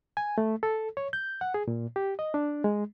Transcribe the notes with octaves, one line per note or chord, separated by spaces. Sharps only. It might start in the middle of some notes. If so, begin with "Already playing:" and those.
G#5
A3
A4
C#5
G6
F#5
G#4
A#2
G4
D#5
D4
G#3